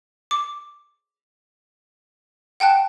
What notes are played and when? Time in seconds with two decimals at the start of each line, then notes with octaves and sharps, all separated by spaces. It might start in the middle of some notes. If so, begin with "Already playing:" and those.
0.31 D6
2.60 F#5 G5 A5 F#6